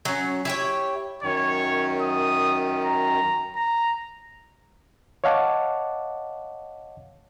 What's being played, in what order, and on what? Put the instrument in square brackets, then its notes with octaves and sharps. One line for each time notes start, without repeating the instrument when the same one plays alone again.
[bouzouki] F#3 C#4
E4 G4 C#5
[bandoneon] F#2 D#3 [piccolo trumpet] C#5
[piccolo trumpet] D#6
A#5
A#5
[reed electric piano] C#5 D#5 F5 F#5 A5 D6